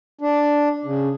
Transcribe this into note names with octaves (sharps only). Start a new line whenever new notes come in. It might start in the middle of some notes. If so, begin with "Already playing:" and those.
D4
C#3